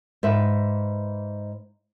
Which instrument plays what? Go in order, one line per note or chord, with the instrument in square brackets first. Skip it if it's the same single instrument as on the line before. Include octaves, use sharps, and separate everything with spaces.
[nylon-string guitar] G#2 B4 E5